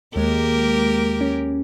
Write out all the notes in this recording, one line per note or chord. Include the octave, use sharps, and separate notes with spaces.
D#2 G#3 A#3 G4 A#4
C#4